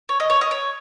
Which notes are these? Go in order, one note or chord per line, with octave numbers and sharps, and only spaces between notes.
C#5
D#5
C#5
D#5
C#5